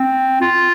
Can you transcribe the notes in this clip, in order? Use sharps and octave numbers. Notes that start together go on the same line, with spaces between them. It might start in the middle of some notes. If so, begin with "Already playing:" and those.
Already playing: C4
F4